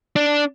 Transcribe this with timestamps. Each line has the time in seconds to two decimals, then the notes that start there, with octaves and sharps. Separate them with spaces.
0.16 D4